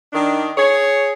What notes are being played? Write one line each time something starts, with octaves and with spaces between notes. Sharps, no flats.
D#3 D4
G#4 C#5